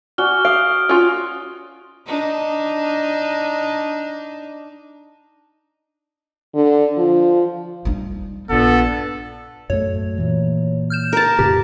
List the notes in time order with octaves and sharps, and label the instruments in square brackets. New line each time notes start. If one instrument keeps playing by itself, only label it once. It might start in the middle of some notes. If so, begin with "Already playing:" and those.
[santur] F#4 D5 G#5 [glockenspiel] F6 G7
[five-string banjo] F5 [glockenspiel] D#6 D7
[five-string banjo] C#4 F4 [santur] F#4
[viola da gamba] D4 D#4
[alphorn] D3
F3
[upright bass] G3 D#4
[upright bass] A#1 [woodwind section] G2 A#2 B3 [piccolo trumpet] A4
[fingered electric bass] F#2 A2 A3 [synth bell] C#5
[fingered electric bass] A#2 E3
[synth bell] F6 G6 E7
[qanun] A#4 A5
[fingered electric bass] F2 A2 C#3 [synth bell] G4